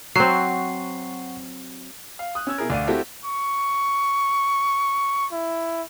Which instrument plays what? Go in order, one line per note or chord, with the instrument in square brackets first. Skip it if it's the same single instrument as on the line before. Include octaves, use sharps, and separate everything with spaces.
[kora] F#3 C4 [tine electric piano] F#5 C#6 C7
[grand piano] F5
D#6 F#6
C#4 E6 G#6
B2 E4 G#4 A#4
D2 D5 F5 D#7
A3 C4 E4 F#4 G4 A4
[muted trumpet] C#6
E4